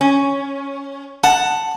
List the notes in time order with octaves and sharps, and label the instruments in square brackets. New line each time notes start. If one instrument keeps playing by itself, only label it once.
[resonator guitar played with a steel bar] C#4
[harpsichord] F#5 [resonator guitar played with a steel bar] A5